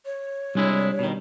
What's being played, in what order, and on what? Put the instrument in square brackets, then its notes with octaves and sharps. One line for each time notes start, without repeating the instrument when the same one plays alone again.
[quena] C#5
[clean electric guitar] C2 G#3 E4 [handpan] G3 D4
[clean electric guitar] B2 D#3